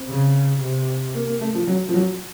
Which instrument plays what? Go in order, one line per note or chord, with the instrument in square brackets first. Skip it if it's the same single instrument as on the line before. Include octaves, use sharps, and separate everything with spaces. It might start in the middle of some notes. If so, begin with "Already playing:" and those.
Already playing: [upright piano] C4
[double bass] C#3
C3
[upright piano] A#3
A#3
A3
F3
F#3
F3
F#3